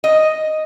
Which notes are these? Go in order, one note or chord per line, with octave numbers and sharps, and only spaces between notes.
D#5